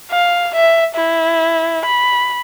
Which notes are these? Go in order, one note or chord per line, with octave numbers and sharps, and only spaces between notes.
F5
E5
E4
B5